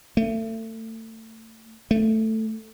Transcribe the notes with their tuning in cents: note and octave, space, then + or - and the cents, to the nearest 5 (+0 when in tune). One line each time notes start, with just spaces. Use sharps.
A3 +30
A3 +5